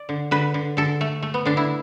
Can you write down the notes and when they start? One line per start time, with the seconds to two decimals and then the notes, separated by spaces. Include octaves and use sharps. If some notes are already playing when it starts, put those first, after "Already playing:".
Already playing: D5
0.09 D3
0.31 D3 B4
0.54 D3
0.77 D3 A4
1.01 A3
1.23 A3
1.34 B3
1.46 D3 D4
1.57 E4